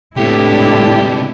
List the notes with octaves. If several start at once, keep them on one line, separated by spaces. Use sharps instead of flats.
A2 C3 G#3 B3 D4 E4 G4